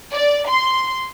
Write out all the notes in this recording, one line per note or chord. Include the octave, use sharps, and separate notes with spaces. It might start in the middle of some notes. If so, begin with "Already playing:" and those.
D5
C6